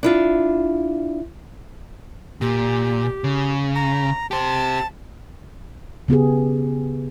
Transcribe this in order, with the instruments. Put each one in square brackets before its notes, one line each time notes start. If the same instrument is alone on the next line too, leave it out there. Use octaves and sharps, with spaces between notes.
[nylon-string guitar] D4 E4 F4
[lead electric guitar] A#2 [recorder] G4
[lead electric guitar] C#3
[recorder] A#5
[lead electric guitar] G4 C5 [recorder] A5
[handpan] C#3 B3 G4 G#4